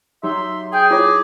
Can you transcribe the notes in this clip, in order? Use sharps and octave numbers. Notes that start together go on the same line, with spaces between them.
F#3 D#4 G4 E5 C6
G#4 G5
E4 F4 C#5 D6